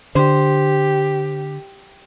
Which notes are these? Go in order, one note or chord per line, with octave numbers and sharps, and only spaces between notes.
D3 G4 C5